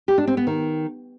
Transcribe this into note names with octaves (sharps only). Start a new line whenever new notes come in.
G4
D4
C4
B3
D#3